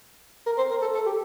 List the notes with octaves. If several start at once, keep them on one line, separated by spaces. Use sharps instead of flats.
A#4
C5
A#4
A4
A4
G4